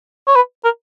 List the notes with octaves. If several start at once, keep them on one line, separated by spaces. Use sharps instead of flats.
C#5
B4
A#4